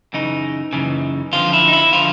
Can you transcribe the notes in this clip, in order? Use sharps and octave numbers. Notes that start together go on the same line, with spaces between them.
F#2 C#3 E3 D#4
F#2 C#3 E3
F2 D3 F3 F4
E4
D#4
E4
D3 F3 F4